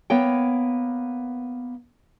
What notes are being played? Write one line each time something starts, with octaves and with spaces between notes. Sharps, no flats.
A#3 B3 C#5 G5